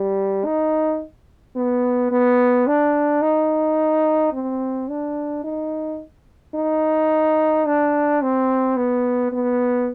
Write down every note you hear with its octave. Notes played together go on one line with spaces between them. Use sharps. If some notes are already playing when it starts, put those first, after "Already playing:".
Already playing: G3
D#4
B3
B3
D4
D#4
C4
D4
D#4
D#4
D4
C4
B3
B3